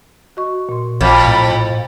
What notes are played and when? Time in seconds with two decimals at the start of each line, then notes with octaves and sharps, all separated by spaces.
0.37 F#4 D#5 C#6
0.69 A#2 C6
1.01 A#1 F2 C#6 F6 G#6
1.27 A2 G5 A#5 B5